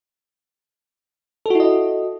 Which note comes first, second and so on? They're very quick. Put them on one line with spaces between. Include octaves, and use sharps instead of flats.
A4 F#4 E4 D#5